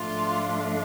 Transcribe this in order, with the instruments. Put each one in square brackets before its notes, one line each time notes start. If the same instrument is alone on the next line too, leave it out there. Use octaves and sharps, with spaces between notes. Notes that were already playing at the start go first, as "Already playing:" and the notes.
Already playing: [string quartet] G#2 F3 A3 D4 F4